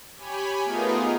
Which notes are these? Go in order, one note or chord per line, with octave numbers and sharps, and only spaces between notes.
G4 C#5 G#5 B5
A3 B3 D#4 F4 G#4 A#4